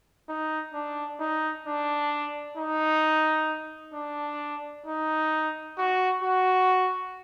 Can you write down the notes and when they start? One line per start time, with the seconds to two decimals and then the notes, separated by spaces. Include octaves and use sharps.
0.29 D#4
0.74 D4
1.20 D#4
1.67 D4
2.57 D#4
3.94 D4
4.86 D#4
5.78 F#4
6.23 F#4